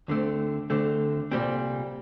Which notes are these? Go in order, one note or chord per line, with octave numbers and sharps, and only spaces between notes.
D2 D3 A3 C4
D2 D3 A3 C4
C2 A#2 G3 C4